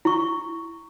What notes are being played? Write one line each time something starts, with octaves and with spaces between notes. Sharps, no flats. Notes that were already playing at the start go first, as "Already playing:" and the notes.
E4 C#6